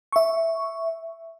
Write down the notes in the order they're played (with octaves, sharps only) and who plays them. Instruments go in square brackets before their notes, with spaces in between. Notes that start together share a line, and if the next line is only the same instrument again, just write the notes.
[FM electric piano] E5 C#6